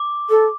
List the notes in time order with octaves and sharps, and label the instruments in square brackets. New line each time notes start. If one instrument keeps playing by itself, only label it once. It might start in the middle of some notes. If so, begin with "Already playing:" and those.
Already playing: [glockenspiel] D6
[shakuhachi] A4